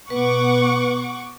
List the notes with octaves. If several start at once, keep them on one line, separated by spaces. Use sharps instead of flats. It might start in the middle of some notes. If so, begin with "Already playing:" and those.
B2 B3 B4 F#5 C#6 D6